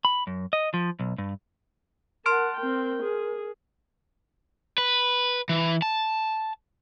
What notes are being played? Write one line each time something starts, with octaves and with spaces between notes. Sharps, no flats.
B5
F#2
D#5
F3
B1
G2
A#4 F#5 A5 C6 F6 D7
C4 A#4 G5
G#4
B4
E3
A5